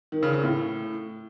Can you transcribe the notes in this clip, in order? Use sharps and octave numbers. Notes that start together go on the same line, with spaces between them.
D#3
C#3
C#3
A2